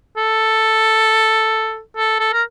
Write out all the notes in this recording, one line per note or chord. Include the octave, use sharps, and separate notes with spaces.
A4
A4
A4
A#4